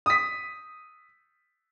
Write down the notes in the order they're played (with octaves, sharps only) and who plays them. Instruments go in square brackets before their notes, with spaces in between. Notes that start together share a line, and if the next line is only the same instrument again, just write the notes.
[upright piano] D#6 B6